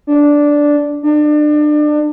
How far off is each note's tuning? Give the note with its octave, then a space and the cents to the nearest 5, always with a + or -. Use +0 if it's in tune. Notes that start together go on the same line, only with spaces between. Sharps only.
D4 -5
D4 +30